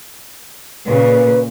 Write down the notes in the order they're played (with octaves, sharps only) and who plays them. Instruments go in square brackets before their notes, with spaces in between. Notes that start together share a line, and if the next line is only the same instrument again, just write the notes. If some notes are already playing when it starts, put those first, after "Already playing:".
[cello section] A#2 C#3 [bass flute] B4